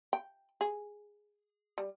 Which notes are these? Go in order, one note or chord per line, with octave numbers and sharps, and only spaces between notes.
G5
G#4
G3